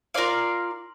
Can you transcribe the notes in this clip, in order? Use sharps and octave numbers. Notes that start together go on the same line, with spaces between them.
F4 A#4 D5 F5